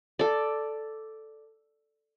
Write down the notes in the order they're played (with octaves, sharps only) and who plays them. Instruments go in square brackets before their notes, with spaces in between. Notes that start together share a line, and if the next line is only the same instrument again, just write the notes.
[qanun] A4 D5